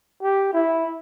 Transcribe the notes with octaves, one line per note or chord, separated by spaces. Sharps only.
G4
E4